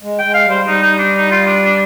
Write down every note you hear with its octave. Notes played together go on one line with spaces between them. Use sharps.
G#3
G#3 G5
F5
G3
C5
G3 D#4
D#4
D4
D#4
F4
D4
D4